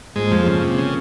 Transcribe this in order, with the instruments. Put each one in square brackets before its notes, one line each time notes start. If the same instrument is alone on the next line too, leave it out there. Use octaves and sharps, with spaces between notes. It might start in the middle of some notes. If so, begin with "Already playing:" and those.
[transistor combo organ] G#2 G#3 [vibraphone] A#3 F4 G#4 C5
[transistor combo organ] F2 F3
C#3
C3
[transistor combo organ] C#3 [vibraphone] C#4 F4 A#4